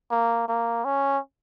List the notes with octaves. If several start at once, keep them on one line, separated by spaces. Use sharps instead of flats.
A#3
A#3
C#4